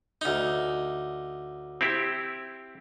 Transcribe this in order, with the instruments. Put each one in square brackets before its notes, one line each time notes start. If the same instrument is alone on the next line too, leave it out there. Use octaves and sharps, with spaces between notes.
[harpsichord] D2 D#4
[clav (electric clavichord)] C4 E4 G4